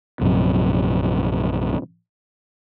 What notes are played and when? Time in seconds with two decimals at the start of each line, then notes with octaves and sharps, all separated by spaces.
0.21 A#1 F#2 C3